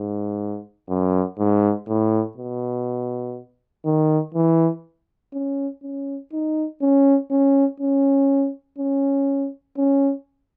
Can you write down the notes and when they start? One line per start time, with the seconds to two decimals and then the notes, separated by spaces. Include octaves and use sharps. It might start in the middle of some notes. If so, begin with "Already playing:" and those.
Already playing: G#2
0.89 F#2
1.38 G#2
1.88 A2
2.37 B2
3.85 D#3
4.35 E3
5.33 C#4
5.83 C#4
6.33 D#4
6.81 C#4
7.31 C#4
7.80 C#4
8.78 C#4
9.77 C#4